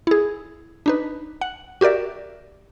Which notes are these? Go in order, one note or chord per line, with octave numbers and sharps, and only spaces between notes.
E4 G#4
D4 D#4 B4
F#5
F#4 G4 A#4 D5 E5